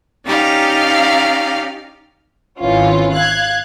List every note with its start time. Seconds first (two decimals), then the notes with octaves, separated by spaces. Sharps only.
0.25 C#4 D#4 G4 D5 F5 A#5
2.60 G#1 D#3 E3 C#4 F4
3.12 F5 F#6 G#6